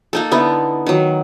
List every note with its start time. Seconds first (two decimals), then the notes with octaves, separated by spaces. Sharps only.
0.13 A#3 D#4 A4
0.31 D3 B3 D#4 E4
0.86 D#3 F#3